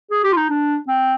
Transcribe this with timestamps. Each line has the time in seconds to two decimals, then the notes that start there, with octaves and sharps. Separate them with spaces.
0.11 G#4
0.24 G4
0.33 F4
0.37 D#4
0.50 D4
0.88 C4